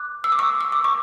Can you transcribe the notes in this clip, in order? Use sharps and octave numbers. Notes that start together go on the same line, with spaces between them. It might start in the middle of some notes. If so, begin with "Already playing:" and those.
Already playing: D6 F#6
E6
D6
C#6 E6
E6
D6
C#6